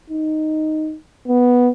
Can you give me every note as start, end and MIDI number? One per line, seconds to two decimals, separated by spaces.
0.10 0.96 63
1.28 1.70 59